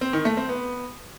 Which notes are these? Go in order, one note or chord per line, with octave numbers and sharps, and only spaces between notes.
C4
D#3
A3
C4
B3